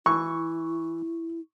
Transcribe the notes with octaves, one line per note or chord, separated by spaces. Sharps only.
E3 E4 C#6